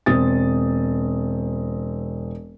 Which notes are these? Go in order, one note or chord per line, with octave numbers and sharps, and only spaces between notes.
E1 C4 D#6 A6